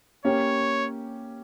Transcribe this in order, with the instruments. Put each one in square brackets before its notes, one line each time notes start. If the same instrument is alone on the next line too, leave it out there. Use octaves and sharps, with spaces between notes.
[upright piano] A#3 C#4 G4 [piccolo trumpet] C#5